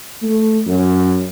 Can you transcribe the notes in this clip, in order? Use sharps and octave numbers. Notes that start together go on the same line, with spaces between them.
A3
F#2